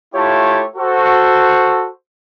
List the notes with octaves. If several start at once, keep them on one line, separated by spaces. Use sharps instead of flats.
A3 E4 F4 G4 C#5 A5
F#4 A4 C5